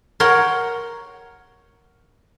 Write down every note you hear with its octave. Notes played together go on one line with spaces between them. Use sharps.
A#4 C#5 F#5 G5 C6